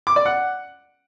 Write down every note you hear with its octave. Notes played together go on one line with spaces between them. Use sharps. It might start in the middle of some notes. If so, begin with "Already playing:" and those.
D6
D5
F#5